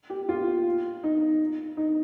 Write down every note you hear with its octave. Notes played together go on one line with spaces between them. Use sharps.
G4
F4
D#4
D#4